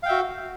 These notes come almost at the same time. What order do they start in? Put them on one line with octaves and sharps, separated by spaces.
F5 G5 E5 F#4